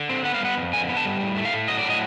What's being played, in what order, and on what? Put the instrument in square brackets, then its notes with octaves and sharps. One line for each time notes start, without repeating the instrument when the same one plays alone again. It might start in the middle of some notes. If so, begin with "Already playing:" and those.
Already playing: [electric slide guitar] D3
C4
B3 F#5
F5
G3 F#5
F2
D3 G#5
B3
A5
G3
A2
A3
F5
A2
F#3 D#5
D5
A2
D#5